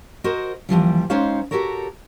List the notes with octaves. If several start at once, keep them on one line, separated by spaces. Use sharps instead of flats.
F#4 A#4 C5 D#5
D#2 E3 F3 G3
G#3 C#4 D#4 C5 C#5 F5
F#4 G4 A4 A#4 C#5